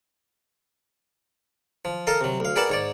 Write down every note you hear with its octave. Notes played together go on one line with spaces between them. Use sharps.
F3
A4 A#4 D#5 F5 A#5
C3 F#3
D2 F5
G#4 A#4 B4 D5 F#5 A5
G#2 C#5 D5